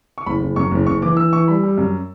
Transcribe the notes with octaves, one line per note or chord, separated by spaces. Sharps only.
C#6
F#1 B5
F#1
F#2 C#6
F#1
F#1 C#6
E3 D6
E3 E6
E3 C#6
G3 B5
G3
F#2